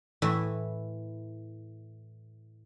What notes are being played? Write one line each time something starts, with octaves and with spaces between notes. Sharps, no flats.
A2 E3 E5